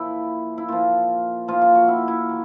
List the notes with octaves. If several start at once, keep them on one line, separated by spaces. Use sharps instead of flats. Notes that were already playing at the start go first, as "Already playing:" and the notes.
Already playing: A#2 F3 E4
E4
A#2 F3 F4
A#2 F3 F4
F4
F#4
E4
E4
D#3